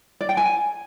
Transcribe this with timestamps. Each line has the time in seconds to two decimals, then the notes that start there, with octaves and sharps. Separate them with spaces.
0.21 D5
0.29 G5
0.37 G#5